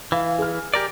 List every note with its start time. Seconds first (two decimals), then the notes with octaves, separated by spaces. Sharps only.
0.12 E3 F5
0.39 G#4 F6
0.74 G4 A#4 D5